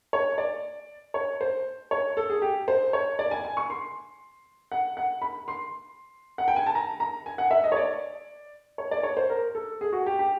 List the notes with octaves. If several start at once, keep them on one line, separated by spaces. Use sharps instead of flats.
C#5
D5
C#5
C5
C#5
A4
G#4
G4
C5
C#5
D5
G#5
G#5
C#6
C6
F#5
F#5
B5
C6
F#5
G5
G#5
A5
A#5
A#5
G#5
F#5
E5
D#5
C#5
D5
C#5
D5
C#5
C5
A#4
A4
G#4
F#4
G4
G4